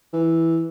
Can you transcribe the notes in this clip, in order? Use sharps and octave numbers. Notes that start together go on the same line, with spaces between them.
E3